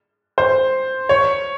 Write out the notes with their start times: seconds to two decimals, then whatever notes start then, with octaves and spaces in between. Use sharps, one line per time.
0.38 C5
1.09 C#5